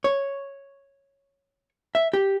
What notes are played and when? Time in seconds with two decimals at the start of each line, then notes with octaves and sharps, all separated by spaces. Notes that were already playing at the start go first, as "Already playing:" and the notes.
0.04 C#5
1.95 E5
2.13 G4